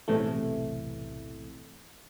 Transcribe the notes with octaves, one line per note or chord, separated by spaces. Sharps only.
B1 E2 A2 C3 E3 A3